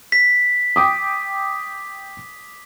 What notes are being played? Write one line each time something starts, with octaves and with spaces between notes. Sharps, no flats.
B6
G5 D6 D#6